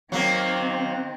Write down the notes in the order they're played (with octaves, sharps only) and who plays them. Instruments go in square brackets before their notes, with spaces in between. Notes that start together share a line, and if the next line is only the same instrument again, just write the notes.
[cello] D#3 C4 [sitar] F#3 A#3